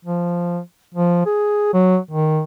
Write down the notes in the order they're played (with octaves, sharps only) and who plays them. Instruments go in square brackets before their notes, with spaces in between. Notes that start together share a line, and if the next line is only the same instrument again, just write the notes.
[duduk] F3
F3
G#4
F#3
D#3